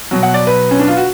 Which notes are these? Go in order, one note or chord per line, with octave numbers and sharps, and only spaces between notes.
B2 F#3
F#5
D5
B4
C#4
D4
F4
F#4